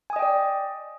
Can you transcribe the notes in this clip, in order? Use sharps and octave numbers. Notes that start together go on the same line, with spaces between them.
D5 D#5 G5 G#5 D#6